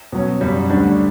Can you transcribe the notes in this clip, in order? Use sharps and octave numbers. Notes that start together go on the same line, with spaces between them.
B2 F#3 C#4
F#2 C#3 G3
D2 D3 G3 D4